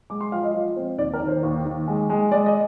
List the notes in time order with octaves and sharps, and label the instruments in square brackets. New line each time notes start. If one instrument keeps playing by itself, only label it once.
[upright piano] G#3 D6
C6
F3 F5
D#5
F3
C4
D#2 D5
A#4
D#3
C5
D#2
D#3
G#3
G#3
G#3 D5
D#5